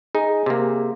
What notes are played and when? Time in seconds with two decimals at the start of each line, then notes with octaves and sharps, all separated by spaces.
0.15 D#4 G#4
0.46 C3 A#3